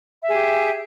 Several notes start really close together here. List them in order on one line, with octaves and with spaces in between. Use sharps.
E5 G#4 G4